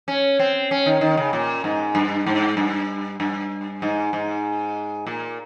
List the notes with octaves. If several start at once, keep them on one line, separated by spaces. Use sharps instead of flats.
C#4
C4
C#4
D#3
D#3
C#3
A#2
G#2
G2
G#2
G2
G2
G#2
G#2
A#2